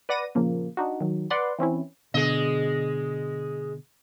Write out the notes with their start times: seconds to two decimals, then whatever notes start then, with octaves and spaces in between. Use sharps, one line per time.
0.09 B4 D5 F#5 A#6 D#7
0.35 A#2 C#3 F3 A#3
0.77 D4 D#4 F#4
1.01 D#3 F#3
1.30 B4 D5 F#5 C6
1.59 E3 C4 C#4 E4
2.14 B2 D3 G#3 D#5